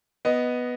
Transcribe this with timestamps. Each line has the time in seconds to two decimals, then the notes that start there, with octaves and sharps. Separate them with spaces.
0.25 B3 D#5